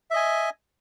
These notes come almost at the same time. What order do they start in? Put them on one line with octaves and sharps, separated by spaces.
E5 D#5 G#5